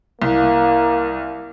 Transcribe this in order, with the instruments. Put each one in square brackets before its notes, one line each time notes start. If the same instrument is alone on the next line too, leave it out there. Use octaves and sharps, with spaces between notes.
[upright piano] C2 [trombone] A#3